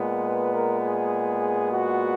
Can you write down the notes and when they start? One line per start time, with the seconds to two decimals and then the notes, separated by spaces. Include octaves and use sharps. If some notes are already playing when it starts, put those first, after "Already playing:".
Already playing: A#2 G#3 B3
0.21 B4
0.51 A#4
0.81 G#4
1.71 F#4